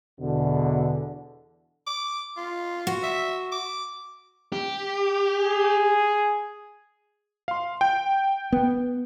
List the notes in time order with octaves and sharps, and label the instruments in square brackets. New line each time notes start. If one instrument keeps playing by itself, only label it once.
[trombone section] E2 B2 D3
[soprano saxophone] D6
F4
[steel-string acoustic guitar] F#4
[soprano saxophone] E5
D6
[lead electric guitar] G4
[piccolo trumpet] G#4
[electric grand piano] F5 C6
G5 G6
[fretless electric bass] B3